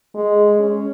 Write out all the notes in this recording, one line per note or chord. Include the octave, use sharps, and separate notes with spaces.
G#3
C#4